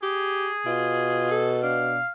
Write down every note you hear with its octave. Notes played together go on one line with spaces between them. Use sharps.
G4 G#4
B2 F4
A4
D4 F5